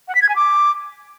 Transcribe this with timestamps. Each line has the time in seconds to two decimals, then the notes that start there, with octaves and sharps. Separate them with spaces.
0.08 F#5
0.15 B6
0.22 G#6
0.29 G#5
0.36 D6